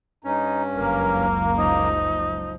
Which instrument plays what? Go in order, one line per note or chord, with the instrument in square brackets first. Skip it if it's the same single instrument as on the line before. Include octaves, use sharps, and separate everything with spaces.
[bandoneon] G2 C#4 [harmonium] D#4
[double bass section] F#1 C#2 [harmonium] A#3 [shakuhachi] A#4
[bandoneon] F3 [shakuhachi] D#4